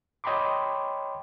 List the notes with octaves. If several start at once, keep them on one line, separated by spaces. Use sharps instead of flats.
C#5 D#5 G5 B5 C6 D6